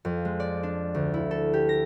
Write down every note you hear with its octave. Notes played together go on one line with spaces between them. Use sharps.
F2
G#3
D5
D4
D2
E4
A4
G4
A#6